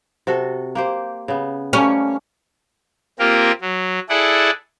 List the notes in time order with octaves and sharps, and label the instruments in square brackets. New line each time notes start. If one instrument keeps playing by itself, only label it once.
[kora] C3 F#4 A4
A#3 G4 C5
C#3 B3
[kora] G3 A3 A#3 [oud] C#4
[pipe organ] A#3 C4 F4 G4 A#4
F#3
E4 G#4 A4 D5 F#5